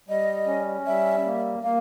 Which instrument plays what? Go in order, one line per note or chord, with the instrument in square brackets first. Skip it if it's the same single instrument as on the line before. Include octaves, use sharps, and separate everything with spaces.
[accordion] G3 [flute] D#5
[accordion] C#4
[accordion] G3 [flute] E5
[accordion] A#3
[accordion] A#3 [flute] F5